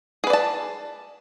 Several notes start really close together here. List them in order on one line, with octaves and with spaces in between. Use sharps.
G#4 B4 D5 A5